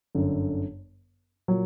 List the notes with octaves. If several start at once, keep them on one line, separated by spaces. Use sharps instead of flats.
G1 F#2 D3
A#2 F#3